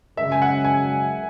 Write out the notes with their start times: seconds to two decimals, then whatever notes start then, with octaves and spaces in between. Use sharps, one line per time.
0.17 F#2 C#3 G#3 E5
0.32 G#5
0.42 F#5
0.65 G#5